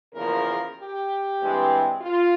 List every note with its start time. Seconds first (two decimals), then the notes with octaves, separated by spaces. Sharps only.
0.15 E2 C#3 F3 A#3 A#4
0.77 G4
1.39 G2 E3 G#3 C4
2.02 F4